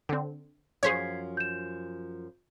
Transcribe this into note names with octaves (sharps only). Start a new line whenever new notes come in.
D3 C4
F#2 F3 G#4 C5 C#5 G#6 B6 C7
G6 E7